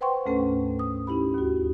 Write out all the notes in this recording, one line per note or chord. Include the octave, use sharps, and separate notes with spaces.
B4 C5 F#5 G5 C6 C#6
D2 G#2 A3 C#4 A4 B4
D#6
C#4 D#4 E4 G4 B5
D#2 F#4